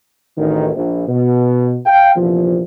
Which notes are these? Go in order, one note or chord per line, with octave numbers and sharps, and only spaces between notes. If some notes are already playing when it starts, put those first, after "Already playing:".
A1 D2 D#3
A#1
B2
F5 G5
A#1 E2 C3 F3